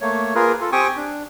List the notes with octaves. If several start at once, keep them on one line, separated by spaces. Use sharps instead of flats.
A3 A#3 C#5
A#3 F4 G#4 A#4 B4
F4 A4
C4 G4 G5 G#5 C#6 D#6
D4